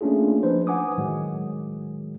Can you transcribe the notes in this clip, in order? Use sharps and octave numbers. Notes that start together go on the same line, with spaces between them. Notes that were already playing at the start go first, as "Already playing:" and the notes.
A3 A#3 C#4 D4 F4 G#4
F3 D4 D#4 B4 C5
F#5 G#5 D6 D#6
A2 D#3 F#3 G#3